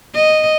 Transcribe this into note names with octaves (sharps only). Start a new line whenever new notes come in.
D#5